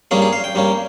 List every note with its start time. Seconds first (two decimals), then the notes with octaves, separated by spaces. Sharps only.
0.11 G2 G3 A#3 C#4 G#4
0.22 G#4
0.33 F5
0.44 G5
0.55 G2 G3 A#3 C#4